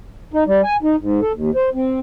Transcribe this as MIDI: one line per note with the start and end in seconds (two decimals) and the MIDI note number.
0.33 0.44 63
0.47 0.61 55
0.64 0.77 80
0.83 0.96 63
0.99 1.20 44
1.21 1.32 69
1.33 1.51 39
1.55 1.70 72
1.74 2.00 60